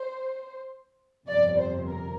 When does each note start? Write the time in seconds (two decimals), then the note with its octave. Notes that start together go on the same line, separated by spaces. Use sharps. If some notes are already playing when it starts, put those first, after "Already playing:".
Already playing: C5
1.28 G1 F2 C3 F3 D5
1.58 C5
1.88 A#4